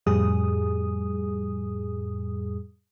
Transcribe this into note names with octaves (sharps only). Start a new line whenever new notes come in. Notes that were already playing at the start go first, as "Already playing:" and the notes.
F2 A2 G3 G#4 D#6